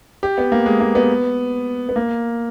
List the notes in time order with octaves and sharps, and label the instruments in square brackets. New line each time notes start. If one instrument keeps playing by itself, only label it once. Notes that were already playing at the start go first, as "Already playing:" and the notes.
[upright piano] G4
B3
A#3
G#3
A#3
B3
B3
A#3